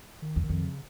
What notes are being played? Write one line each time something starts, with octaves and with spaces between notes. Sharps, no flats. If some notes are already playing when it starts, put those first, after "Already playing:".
D#3
E2
D#3
F2
C#3